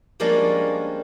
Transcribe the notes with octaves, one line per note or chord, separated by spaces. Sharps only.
F3 G3 G#3 A#3 C#4 D4